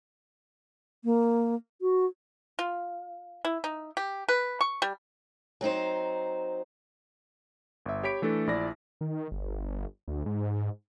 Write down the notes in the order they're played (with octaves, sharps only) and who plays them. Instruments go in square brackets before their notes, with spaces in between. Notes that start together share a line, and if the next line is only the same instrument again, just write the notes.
[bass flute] A#3
F#4
[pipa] F4
E4
D#4
G4
B4
C#6
G3
[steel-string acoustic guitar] F#3 C4 D#4 C5
[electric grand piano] G1 E5
G4 C#5 B5 B6 D7
E3 A3 D4 A4
A#1 E4 D5 A#6
[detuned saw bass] D#3
G1
D2
G#2